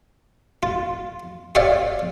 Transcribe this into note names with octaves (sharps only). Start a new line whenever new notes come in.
F4
G4 C#5 D5 E5 F5